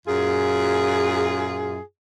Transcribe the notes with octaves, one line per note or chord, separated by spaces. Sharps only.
F#2 A#2 F4 G#4